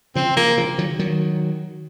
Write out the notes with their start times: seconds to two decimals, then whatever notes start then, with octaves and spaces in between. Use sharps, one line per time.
0.15 C#3 F3 C4
0.37 C#3 F3 A#3
0.58 C#3 F3
0.78 D#3 F#3
0.99 D#3 F#3